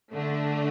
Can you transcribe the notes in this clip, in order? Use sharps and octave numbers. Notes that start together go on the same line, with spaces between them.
D3 A3 D4